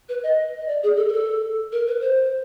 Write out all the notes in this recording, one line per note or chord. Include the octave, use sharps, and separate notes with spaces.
B4
D#5
D#5
D5
G#4
A4
A#4
A4
A#4
B4
C5